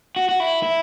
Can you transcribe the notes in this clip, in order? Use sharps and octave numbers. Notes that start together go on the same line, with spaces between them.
F#4
F#4
E4
E4